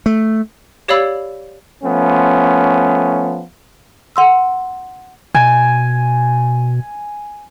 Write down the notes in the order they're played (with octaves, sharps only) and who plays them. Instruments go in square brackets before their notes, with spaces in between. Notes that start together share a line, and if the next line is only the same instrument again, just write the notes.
[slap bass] A3
[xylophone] G4 C#5 D5 F5 B5 E6
[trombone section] F3 A3 B3 C#4
[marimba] F#5 C6 E6
[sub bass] B2 [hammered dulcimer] G#5